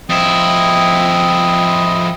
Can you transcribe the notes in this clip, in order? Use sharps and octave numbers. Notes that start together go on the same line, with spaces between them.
F2 C4 E4 D#5 D#6